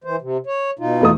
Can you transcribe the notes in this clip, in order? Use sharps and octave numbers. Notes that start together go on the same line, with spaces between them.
E3 C5
C3
C#5
B2 D#4 F4
E2 A3 D#6